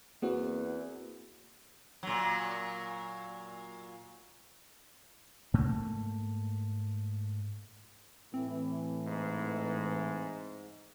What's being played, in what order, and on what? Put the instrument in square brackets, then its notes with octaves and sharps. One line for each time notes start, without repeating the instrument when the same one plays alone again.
[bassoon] E2 [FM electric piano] A#3 C4 F#4
[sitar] A#2 F#3
[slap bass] G#2 A3 A#3
[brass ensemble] A2 E3 [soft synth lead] C4
[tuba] G#2